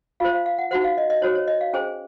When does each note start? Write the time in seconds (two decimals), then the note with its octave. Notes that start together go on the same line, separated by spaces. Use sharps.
0.20 F4 C5 F5
0.33 F5
0.46 F5
0.58 F#5
0.71 D#4 F#4 C5 F#5
0.84 F5
0.98 D#5
1.10 D#5
1.22 D#4 F#4 C5 C#5
1.35 C#5
1.48 D#5
1.61 F5
1.73 C#4 G#4 C5 G#5